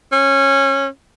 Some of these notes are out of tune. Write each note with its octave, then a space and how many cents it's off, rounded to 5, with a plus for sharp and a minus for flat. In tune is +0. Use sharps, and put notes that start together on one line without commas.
C#4 -20